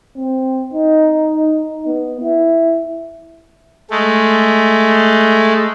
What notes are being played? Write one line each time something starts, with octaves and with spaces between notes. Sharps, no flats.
C4
D#4
D#4
B3
E4
G#3 A3